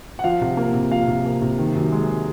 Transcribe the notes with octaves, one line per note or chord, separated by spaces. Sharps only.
F#5
F3 F5
C3
A#3
C3
F3 F5
C3
A#3
C3
D#3
F#2
G#3